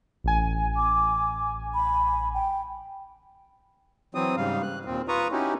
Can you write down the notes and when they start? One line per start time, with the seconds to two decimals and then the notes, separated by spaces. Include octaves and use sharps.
0.24 A1 G#5
0.77 D6
1.74 B5
2.34 G5
4.15 E3 F#3 C4 D#6
4.37 G#2 C#3 G3 F5
4.63 F#6
4.85 D#2 A#2 C4
5.08 F4 B4 A#5 C#6 D#6
5.32 C#4 D#4 E4 F#4 G4